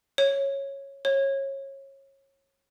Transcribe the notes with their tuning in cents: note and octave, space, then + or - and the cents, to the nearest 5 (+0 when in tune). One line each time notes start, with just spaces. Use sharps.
C#5 -10
C#5 -25